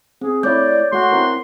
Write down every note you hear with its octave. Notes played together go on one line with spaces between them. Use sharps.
C4 G#4
A3 E4 C#5 D5 D6 G6
A3 F#4 C6
C4 E4 A#4